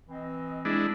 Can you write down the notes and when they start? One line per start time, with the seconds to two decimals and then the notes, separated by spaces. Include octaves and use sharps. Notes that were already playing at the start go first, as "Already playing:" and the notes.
0.09 E3 C4 D#5
0.65 G#3 D4 E4